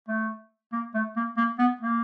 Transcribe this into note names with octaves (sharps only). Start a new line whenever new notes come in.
A3
A#3
A3
A#3
A#3
B3
A#3